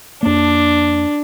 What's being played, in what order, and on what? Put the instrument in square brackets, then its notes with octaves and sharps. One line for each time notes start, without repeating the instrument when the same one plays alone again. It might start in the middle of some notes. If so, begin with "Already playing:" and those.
[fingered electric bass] F2 A#3 [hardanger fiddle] D4